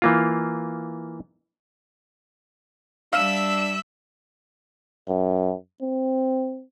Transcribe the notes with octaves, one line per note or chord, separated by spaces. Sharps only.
E3 A#3 F4
G3 D4 E5 F5 E6 F6 E7
F#2
C4